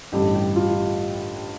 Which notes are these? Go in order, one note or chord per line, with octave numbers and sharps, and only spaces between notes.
A1 G2 D3 G3 G4
G4
F4